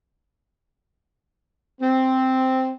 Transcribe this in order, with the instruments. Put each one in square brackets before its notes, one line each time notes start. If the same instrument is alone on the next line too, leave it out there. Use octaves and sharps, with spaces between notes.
[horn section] C4